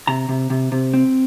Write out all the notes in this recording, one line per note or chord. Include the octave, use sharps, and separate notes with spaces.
C3 A#5
C3
C3
C3
C4